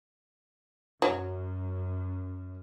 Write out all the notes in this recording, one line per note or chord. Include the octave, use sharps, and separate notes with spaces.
F#2 F#3